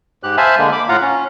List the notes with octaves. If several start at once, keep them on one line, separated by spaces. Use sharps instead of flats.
G#2 G4 F#6
C5 E5 F5 G#5 A5 B5
D3 G#3 A#3
B5 D6
A2 F4 F5 F#5 A#5
C#4